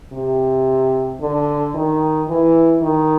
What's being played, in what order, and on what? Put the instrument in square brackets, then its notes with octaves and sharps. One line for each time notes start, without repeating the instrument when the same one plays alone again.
[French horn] C3
D3
D#3
E3
D#3